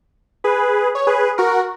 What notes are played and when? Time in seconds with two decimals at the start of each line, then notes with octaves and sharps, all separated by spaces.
0.44 G#4 B4
0.95 C#5
1.07 G#4 B4
1.38 F#4 A#4